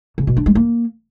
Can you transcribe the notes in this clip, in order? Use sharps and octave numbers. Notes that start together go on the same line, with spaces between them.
C#3
B2
D4
G#3
A#3